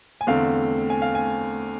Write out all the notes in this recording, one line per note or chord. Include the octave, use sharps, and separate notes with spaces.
G#5
E2 D3 A3 C4 F5
G#5
F5
G#5